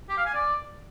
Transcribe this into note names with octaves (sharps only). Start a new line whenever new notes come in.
G4
F5
G#5
D5